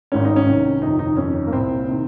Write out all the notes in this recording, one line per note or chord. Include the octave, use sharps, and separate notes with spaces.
G#1 G#2 D#3 C#4
D#4
C#4
C2 C3 D#3
G1 F2 C3 D#3 D#4
D#4
G1 F2 D#3 C#4
A#3
C2 A#2 C4
C3 D#3